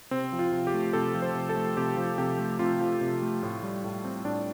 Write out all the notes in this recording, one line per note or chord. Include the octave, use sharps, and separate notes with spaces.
C3 C4
F3
F4
C3
G4
A3
C3 A4
F3
C5
C3
A4
A3
C3 G4
F3
C3 G4
A3
C3 F4
F3
C3
A3
A2
G3
A2
C4
A2 D4